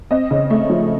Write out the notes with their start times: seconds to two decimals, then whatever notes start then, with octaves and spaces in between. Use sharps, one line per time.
0.11 C4 D#5
0.31 C#3
0.50 A3
0.70 F3